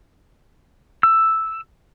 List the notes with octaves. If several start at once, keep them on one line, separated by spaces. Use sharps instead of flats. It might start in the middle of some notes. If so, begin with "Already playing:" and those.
E6